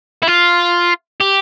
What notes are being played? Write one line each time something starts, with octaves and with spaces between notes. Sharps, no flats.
E4
F4
G4